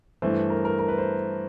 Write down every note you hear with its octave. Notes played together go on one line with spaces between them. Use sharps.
G2 E3 A3 C5
A#4
A#4
A#4
B4
C5